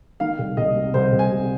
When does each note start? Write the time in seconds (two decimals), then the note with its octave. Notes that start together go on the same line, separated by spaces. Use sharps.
0.20 D#3 F5
0.39 C2
0.57 C2 D#5
0.76 C3
0.94 C2 C5
1.12 C2
1.19 G#5
1.32 C3